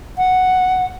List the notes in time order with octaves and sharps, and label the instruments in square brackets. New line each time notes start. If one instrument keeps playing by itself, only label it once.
[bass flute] F#5